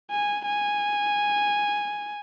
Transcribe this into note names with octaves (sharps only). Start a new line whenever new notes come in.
G#5
G#5